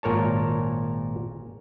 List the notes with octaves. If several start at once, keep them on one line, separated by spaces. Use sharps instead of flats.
G#1 A#2 A#4 C#5 A5